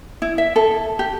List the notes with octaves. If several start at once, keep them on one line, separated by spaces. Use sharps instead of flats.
E4
E5
A4
G4